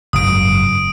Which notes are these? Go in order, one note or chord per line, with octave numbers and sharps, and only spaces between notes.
F#1 G#2 D#6 D7